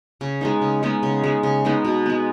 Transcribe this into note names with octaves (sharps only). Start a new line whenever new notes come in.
C#3
G#3 B3 D#4
C#3
G#3 B3 D#4
C#3
G#3 B3 D#4
C#3
G#3 B3 D#4
B2
G#3 B3